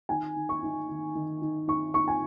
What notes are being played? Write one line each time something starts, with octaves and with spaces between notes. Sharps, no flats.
D#3 G#5
D#3
C#6
D#4
D#3
D#3
D#3
D#4 C#6
D#4 C#6
G#5